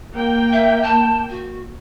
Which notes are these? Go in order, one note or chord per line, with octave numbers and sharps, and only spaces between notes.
A#3 G5
E5
A5
F#4